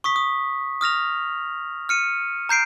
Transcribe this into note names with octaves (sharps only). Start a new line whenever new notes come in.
C#6 D#6 B6
D#6
D#6 F6 A#6 F7
F6 C#7 D#7
A#5 G6 C7 D7